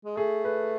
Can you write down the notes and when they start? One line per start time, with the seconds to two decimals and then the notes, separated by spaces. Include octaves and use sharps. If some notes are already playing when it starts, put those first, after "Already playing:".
0.05 G#3
0.17 A3 G#4
0.45 B4